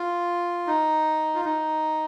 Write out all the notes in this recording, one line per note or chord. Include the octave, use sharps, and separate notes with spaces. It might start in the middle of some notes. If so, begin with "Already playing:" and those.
Already playing: F4
D#4
F4
D#4